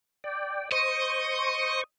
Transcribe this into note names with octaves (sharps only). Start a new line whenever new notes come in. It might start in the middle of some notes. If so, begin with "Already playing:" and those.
D5 G5
C5 D#5 C#6